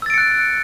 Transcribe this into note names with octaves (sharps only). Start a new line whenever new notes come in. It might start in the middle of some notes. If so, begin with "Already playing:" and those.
E6 F#6 A6 C#7 D7